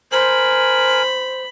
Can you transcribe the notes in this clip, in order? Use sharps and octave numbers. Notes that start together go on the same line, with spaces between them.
A#4 C5 G#5 B5